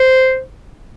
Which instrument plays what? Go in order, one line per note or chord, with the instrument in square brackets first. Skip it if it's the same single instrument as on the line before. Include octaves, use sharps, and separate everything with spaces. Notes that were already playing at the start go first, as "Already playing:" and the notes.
Already playing: [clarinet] C5